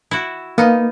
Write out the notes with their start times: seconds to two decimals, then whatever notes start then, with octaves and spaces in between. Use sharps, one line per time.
0.11 E4 F#4
0.58 A#3 B3 D#4 F5